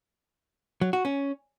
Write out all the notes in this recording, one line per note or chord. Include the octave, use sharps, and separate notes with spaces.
F#3
F#4
C#4